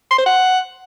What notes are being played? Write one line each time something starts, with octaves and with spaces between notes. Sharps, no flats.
C6
C5
F#5